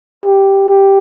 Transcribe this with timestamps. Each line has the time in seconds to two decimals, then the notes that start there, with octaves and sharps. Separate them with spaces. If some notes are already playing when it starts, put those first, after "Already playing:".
0.25 G4
0.69 G4